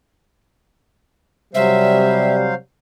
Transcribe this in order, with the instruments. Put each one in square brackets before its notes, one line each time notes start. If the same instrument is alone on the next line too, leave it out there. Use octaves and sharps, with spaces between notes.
[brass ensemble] C3 G3 [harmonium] F#3 C5 F5 [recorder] E5